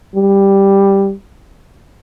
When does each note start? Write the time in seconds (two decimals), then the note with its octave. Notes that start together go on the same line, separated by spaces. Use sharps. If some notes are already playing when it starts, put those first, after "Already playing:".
0.15 G3